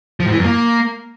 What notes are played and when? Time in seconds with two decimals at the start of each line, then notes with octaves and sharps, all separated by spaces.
0.20 F3
0.26 G#2
0.32 E3
0.38 F#2
0.45 A#3